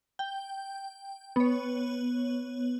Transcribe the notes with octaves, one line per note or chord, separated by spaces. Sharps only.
G5
B3 C#5